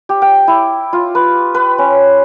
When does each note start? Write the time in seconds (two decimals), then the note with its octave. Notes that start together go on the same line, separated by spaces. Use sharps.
0.09 G4
0.22 G5
0.48 E4
0.93 F4
1.15 B4
1.54 B4
1.78 C#4